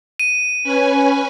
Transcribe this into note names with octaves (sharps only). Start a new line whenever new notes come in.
D#7
C#4 B4 G#5